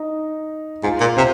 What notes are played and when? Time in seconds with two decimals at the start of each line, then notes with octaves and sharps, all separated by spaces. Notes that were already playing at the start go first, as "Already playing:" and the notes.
Already playing: D#4
0.83 G#2 F4
1.01 A#2
1.17 C3 C5